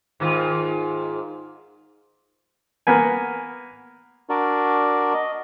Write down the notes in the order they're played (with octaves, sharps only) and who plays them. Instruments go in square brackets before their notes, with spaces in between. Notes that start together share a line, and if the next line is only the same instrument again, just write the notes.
[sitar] G#2 D#3 F4
[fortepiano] A#3 B3 B4 G#5
[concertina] D4 F#4 A#4 D5
D#5